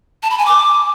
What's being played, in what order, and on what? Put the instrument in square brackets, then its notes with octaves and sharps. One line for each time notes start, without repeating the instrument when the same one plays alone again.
[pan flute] A5
B5
G#5
D6